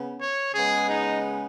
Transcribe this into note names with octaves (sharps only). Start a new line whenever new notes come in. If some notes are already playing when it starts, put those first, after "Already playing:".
Already playing: C#3 B3
C#5
C#3 G#3 B3 G#4
D#4